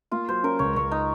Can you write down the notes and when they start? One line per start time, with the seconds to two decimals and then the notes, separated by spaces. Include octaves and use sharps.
0.12 A#3 F4
0.28 F#3 C5
0.43 C#4 A#4
0.59 C#2 C#5
0.76 C#2 C#5
0.91 D#4